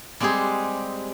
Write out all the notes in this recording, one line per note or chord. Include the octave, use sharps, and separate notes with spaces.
G3 G#3 C4 G4 G#4